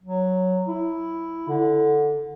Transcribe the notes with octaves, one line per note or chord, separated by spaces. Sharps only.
F#3
E4
D3